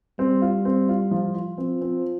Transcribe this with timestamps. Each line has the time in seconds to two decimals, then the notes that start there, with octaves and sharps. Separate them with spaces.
0.19 G3 C4
0.42 F4
0.65 C4
0.89 F4
1.11 F3
1.35 F4
1.58 F3 C4
1.81 C4